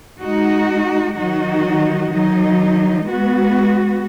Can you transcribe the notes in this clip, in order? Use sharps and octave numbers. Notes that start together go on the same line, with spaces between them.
G#3 D#4 F#4
D#3 F#3 D#4 F#4
D#3 F#3 D#4
G#3 B3 F#4